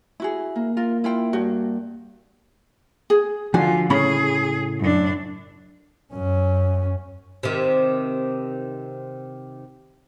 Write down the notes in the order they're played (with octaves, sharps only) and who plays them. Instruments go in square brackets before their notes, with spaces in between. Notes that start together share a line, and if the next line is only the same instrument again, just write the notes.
[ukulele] E4 F#4 G#4
[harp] A#3
[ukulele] F4 [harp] A#4
[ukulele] E4 F4 G5
[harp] G2 [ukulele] F#4
[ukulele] G#4
[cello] D3 F4 [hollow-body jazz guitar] F3 D4 F#4 [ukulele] G#5
[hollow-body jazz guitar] A2 C#3 B5 [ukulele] C#4 [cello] G#4
[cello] F#2 D4
[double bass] F#2 C#4
[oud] C3 D#3